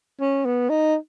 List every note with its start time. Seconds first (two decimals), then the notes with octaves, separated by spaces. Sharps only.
0.20 C#4
0.45 B3
0.69 D#4